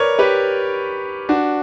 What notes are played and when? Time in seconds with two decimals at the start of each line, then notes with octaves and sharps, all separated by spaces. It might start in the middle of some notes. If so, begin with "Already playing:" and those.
Already playing: A#4 B4 C#5 D5
0.19 G4 B4
1.29 D4 F#4